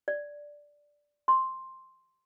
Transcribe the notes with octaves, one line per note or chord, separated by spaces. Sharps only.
D5
C6